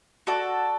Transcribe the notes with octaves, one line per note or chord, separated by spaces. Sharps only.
F#4 A4 D5